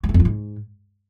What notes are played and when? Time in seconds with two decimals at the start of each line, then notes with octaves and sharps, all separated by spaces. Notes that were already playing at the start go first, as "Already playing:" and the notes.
0.03 F#3
0.09 A3
0.14 F2
0.20 F3
0.25 G#2